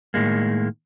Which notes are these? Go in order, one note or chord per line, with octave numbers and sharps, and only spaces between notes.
A2 D#3 G#3 A#3